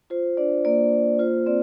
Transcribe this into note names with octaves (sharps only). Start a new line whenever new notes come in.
F4 C5
D4 D5
A#3 D5
A#3
F4 C5
C4 D5